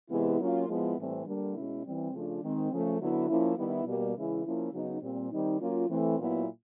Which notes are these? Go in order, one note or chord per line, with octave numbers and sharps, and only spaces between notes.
C3 E3 G#3 B3 E4
F#3 A#3 C#4 F4
F3 G#3 B3 E4
A2 E3 G3 C4
D3 G3 A#3
B2 G#3 C#4 E4
E3 G3 C4
C#3 F3 A3 D4 F4
D#3 G#3 C4
C#3 F3 A3
D3 F#3 B3 E4
F3 A#3 C#4 E4
D#3 G3 B3 E4
B2 G3 A#3
C#3 E3 G#3 C#4 E4
F3 A#3 C#4 E4
C#3 F#3 B3 D#4
A#2 G3 C4
D#3 G3 C4 D#4
F#3 A#3 C#4 F4
E3 A3 C4
A#2 F#3 B3 E4